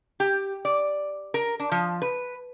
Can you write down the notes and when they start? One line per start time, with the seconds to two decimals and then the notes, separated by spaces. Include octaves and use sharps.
0.20 G4
0.65 D5
1.34 A#4
1.60 D4
1.72 F3
2.02 B4